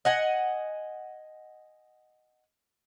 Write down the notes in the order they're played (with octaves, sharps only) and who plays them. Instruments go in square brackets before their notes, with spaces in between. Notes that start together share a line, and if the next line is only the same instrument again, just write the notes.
[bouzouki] D#5 F#5 G#5